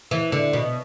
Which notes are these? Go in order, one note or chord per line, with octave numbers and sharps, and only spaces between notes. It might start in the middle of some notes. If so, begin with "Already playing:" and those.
E3
D3
B2